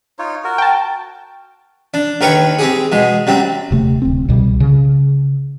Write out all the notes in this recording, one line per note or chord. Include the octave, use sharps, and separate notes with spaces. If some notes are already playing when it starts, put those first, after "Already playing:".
D#4 F4 C#5
F#4 A#4
G5 A5
D4
D#2 A#4 B4 C#5 G5 C#6
C4 G4 G#4
B2 G#3
F#2 G3 C4
D#1 C3 A3
D1 C4
C2 B2 G3
C#3